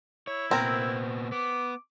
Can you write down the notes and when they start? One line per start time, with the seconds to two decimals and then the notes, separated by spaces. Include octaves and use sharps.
0.27 E4 C#5
0.51 A#2 B3 C4 A#4
1.32 B3 D6